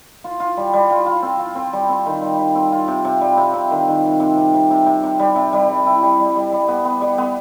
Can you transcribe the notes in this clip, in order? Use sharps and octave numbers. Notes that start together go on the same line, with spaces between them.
F4
F4
G3
G3
F4
F4
C4
F4
C4
G3
C4
D#3
G3
G3
C4
F4
C3
C3
G3
C3
C3
D#3
D#3
C3
C3
C3
C3
C3
C3
C3
G3
C3
G3
G3
E4
G3
G3
G3
G3
B3
B3
G3
B3